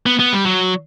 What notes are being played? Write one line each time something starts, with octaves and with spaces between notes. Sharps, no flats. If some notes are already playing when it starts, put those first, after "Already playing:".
B3
B3
G3
F#3